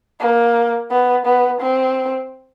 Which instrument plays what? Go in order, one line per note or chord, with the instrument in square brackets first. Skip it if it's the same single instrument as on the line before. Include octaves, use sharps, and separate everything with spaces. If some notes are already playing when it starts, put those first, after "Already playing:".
[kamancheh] A#3
B3
B3
C4